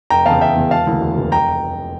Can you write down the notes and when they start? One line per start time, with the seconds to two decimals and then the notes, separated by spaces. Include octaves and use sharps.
0.10 F1 G5 A#5
0.26 E2 C#3 F5 A5
0.41 F1 E5 G5
0.56 E2 C#3
0.71 E1 F5 A5
0.87 D2 C#3 E3 A#3
1.01 E1
1.17 D2 C#3 E3 A#3
1.32 F1 G5 A#5